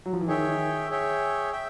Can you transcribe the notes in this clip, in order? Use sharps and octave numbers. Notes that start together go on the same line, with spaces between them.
F#3
F3
E3
D#3 G#4 C#5 E5 G5
D#3
G#4 C#5 E5 G5
E5 G5